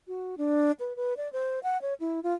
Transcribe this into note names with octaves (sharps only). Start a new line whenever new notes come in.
F#4
D4
B4
B4
D5
C5
F#5
C#5
E4
F4